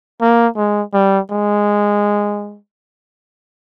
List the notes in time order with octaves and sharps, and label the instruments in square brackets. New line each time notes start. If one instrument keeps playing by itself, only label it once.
[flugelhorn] A#3
G#3
G3
G#3